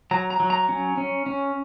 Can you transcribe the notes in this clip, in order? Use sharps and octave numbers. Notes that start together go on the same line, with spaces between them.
F#3 A#5
A#5
F#3
A#5
C#4
C#4
C#4